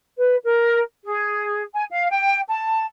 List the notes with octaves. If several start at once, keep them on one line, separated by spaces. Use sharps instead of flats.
B4
A#4
G#4
G#5
F5
G5
A5